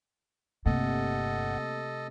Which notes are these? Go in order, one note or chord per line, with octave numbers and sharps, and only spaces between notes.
G1 G2 C3 A3 A#3 A4 D#5 F#5